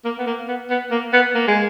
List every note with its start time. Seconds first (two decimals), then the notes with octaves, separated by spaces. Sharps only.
0.05 A#3
0.18 B3
0.26 A#3
0.48 B3
0.70 B3
0.91 A#3
1.13 B3
1.35 A#3
1.48 G#3